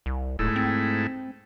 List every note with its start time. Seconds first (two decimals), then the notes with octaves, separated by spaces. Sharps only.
0.06 C2
0.39 D1 G#2 A3 E4
0.56 C4